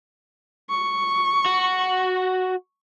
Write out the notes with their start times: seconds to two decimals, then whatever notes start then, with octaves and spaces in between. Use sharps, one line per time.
0.70 C#6
1.46 F#4